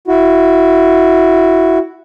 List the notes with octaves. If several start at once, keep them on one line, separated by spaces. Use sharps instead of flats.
E4 F#4